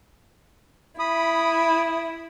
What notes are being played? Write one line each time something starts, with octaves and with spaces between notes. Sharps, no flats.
E4 B5 D#6